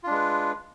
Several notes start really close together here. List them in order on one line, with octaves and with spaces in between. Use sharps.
F4 D4 G#3 B4